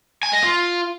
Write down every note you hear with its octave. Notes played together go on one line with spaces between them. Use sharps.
G#5
D#5
F4